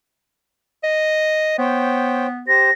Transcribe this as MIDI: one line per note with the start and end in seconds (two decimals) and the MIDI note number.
0.84 1.55 75
1.59 2.48 59
1.59 2.27 72
1.59 2.27 73
1.59 2.27 79
2.48 2.70 67
2.48 2.70 72
2.48 2.73 94